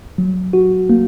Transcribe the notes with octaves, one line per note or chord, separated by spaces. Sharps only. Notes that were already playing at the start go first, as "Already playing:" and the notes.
F#3
F#4
A#3